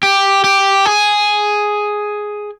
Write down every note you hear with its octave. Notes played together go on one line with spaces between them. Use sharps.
G4
G4
G#4